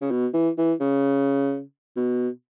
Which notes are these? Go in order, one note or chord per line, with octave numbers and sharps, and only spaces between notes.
C#3
B2
E3
E3
C#3
B2